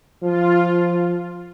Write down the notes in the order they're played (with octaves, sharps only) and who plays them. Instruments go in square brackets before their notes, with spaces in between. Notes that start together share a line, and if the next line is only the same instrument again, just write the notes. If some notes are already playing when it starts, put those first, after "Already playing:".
[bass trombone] F3 [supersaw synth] F4